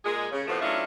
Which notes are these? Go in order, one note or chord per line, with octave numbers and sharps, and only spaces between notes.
A#2 G#3 G#4
C#3
E2 A2 C3 F3 A3 B3
F#3 A3 C#4 D4 E4 F4